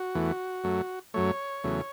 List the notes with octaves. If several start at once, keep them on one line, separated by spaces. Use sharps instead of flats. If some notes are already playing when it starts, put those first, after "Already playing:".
Already playing: F#4
E2 E3 A3
F#2 F#3 A3
F#2 F#3 A3 C#5
E2 C#3 F#3 A3